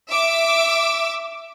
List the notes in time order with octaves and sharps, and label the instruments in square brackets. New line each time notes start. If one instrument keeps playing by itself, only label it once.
[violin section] E5 D6